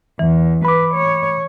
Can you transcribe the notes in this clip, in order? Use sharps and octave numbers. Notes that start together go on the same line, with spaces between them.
E2 E3
B4 B5 D6
C#5